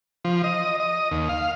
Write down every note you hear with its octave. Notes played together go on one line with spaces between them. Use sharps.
F3
D#5
D#5
D#2
F5